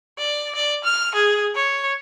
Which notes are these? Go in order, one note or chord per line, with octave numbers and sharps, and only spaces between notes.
D5
D5
F6
G#4
C#5